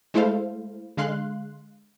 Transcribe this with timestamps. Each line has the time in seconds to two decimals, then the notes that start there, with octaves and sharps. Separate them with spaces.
0.14 G#3 A3 E4 A4 C5 F5
0.97 D3 G#3 F5 C6 F#6